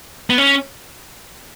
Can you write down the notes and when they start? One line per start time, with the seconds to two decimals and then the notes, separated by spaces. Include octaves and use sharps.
0.30 B3
0.38 C#4